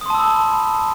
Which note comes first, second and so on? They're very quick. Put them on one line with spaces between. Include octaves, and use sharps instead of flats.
D#6 C6 A5 E6 B5